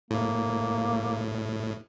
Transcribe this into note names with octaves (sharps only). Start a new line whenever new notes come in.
A2 A#3